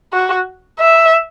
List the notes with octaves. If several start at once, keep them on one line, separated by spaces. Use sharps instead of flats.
F#4
E5